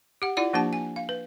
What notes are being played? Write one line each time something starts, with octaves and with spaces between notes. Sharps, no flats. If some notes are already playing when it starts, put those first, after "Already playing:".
G4 F#5
E4 F4 D5 F#5
F3 A#3 D4 G4 A5
G#5
F5
B4